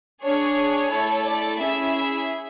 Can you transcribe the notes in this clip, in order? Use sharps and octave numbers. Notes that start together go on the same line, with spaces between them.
D4 G#4 C#5
A3 E4 A4
D5
C#4 E4 G#4 E5
E5